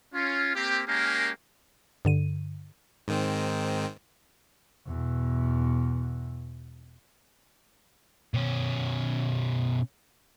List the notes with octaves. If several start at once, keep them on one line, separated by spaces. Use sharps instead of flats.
C#4 F4
A#3 C4 G4
G#3 A#3 C#4 G4 G#4 A#4
G2 D3 D#7
G#2 D#3 C4
E2 B2
B2 C#4